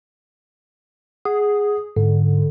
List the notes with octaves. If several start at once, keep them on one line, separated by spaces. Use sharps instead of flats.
G#4 F#5
G#2 D3